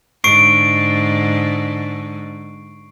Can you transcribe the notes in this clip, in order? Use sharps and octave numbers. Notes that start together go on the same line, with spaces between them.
G#2 D3 C#6 C7 D7